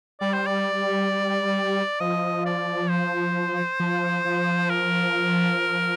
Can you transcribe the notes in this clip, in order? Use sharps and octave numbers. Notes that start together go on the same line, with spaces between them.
G3 D5
C5
D5
F3 D#5
D5
C5
F3
F3
A#4